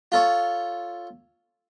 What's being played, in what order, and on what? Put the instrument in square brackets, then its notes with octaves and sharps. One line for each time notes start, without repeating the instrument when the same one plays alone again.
[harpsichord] F4 A4 C#5